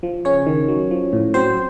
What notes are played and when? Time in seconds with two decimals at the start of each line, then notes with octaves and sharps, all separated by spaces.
0.03 F3
0.25 C#3 C#4 C#5
0.47 D#3
0.68 F#3
0.91 F3
1.13 A2
1.34 F#3 C4 C5